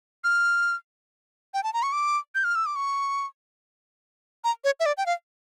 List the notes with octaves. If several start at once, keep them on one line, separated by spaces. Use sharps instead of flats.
F6
G5
A5
A#5
C#6
D6
G6
F6
E6
D6
C#6
A#5
C#5
E5
D5
G5
F5